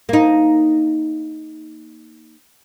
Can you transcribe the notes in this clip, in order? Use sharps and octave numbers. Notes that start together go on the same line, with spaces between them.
A#3 D#4